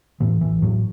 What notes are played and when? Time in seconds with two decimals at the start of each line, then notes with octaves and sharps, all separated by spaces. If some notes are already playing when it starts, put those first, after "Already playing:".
0.20 A2 E3
0.41 A1 E3
0.62 A2 F#3